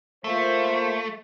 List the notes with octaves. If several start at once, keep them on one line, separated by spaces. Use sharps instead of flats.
A3 A#3 F4 C5